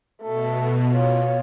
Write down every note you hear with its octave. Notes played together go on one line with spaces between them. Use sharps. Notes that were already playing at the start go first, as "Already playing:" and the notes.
B2 A3
F4 C#5